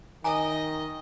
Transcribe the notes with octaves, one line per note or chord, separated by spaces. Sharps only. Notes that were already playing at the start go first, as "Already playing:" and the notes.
D#3 D#5 G#5 A#5